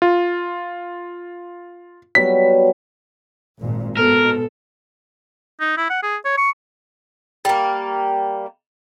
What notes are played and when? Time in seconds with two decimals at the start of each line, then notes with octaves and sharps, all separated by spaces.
0.02 F4
2.15 F#3 G3 B3 B6
3.60 G#1 A#2
3.97 G#2 B2 A4 A#4
5.61 D#4
5.77 E4
5.90 F#5
6.03 G#4
6.25 C#5
6.38 C#6
7.45 G3 A#3